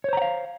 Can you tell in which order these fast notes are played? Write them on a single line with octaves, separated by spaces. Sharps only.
C#5 C5 A#5 F#5 F5